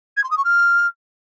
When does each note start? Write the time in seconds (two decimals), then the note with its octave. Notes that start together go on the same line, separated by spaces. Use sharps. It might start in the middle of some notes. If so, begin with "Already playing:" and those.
0.17 G#6
0.24 C6
0.31 D#6
0.37 C#6
0.44 F6